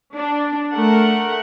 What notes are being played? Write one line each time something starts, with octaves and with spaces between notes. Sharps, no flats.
D4
A3 A#4 F#5